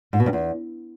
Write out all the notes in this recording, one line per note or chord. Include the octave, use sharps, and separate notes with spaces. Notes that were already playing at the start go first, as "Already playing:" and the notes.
G#2
B2
G2
E2